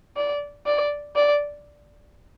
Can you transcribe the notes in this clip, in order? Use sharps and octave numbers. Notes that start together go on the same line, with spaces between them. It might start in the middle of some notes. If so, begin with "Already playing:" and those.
D5
D5
D5